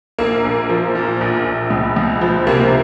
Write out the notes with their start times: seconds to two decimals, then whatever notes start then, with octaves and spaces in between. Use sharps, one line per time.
0.18 A#1 A#3
0.45 A#1
0.69 F3
0.95 A#2
1.21 A#1
1.46 A#1
1.70 C#2
1.96 C#2
2.21 F3
2.47 C3 A#3